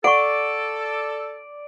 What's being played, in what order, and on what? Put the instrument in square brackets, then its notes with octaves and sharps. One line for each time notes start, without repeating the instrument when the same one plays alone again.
[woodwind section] A4 [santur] D5 [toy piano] F#5 C#6 [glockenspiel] D7